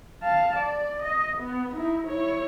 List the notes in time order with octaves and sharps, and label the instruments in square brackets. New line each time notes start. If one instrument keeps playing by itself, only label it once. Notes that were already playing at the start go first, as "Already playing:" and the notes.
[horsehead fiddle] F5 A5
D5
D#5
B3
D#4 E4
E4 C#5